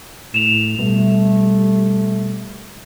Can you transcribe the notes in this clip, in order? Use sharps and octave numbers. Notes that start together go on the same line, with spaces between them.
A2 E7 F7
B2 G3 A3